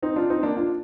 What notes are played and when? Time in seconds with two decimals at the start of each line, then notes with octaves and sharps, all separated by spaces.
0.02 C4 D#4
0.16 D4 F4
0.30 C4 D#4
0.43 A#3 D4
0.57 D4 F4